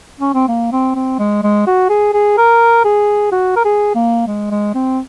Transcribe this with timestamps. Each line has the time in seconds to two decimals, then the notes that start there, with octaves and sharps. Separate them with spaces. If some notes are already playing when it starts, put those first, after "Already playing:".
0.20 C#4
0.34 C4
0.48 A#3
0.72 C4
0.95 C4
1.19 G#3
1.43 G#3
1.67 F#4
1.89 G#4
2.13 G#4
2.38 A#4
2.85 G#4
3.32 F#4
3.56 A#4
3.65 G#4
3.95 A#3
4.27 G#3
4.51 G#3
4.75 C4